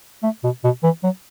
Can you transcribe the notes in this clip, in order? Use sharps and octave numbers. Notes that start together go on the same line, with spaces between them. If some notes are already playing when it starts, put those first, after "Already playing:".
A3
B2
B2
E3
F#3